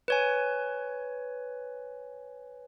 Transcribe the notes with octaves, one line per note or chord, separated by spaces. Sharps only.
B4 C#5 G#5